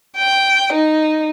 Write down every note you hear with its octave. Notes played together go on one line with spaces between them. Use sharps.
G5
D#4